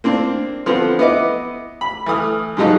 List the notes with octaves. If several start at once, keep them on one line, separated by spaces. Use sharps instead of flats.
A#3 C4 D4
D3 F3 B3 C4
B3 E4 D#5 D6
B5
E3 A3 D#6 F6
G#2 D3 F3 F#3 D#4 A4